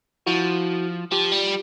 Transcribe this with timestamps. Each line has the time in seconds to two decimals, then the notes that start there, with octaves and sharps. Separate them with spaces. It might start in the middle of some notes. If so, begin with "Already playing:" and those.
0.26 F3 E4 F#4
1.12 F3 F4 G4
1.32 G3